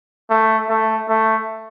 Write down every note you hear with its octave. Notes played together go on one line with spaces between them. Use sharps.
A3
A3
A3